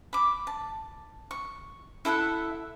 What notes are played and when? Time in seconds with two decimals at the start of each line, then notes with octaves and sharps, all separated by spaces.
0.13 B5 D6
0.47 A5
1.31 C#6
2.05 E4 A4 E5 F#5